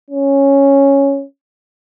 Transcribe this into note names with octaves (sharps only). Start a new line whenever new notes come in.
C#4